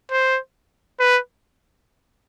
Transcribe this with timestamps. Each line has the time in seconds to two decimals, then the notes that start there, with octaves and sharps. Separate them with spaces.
0.11 C5
1.00 B4